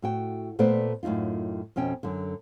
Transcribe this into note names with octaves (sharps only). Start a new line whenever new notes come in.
A2 F#4 G5
A#2 A3 B3 B4 C5 D5
F#2 A2 C3 D#4 F4
F2 B2 C#4 G5
F#2 D3